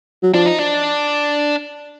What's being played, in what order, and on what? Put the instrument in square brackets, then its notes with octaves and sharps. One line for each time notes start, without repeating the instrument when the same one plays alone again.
[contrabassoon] F#3
[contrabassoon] F3 [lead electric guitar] D4
[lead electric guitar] D#4
D4